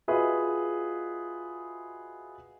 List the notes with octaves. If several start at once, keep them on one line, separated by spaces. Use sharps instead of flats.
F4 F#4 G#4 B4 D#5 E5